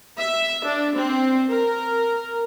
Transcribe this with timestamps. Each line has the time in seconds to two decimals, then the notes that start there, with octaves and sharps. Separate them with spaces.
0.18 E5
0.64 D4
0.96 C4
1.47 A#4